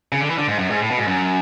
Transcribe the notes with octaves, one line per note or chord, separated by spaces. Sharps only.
C#3
D3
E3
D3
G#2
F#2
G#2
A2
B2
G#2
F#2